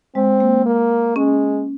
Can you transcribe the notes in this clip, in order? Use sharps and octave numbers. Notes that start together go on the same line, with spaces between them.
G#3 C4
A#3
A#3
G#3 C#4